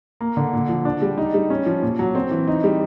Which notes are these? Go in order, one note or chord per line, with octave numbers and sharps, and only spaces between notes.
A#3
D3
A#2
F3
D4
G3
D#4
G3
C#4
F3
A#2
F#3
C4
E3
D#4
G3